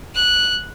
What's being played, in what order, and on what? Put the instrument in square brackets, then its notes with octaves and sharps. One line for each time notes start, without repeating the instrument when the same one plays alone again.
[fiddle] F#6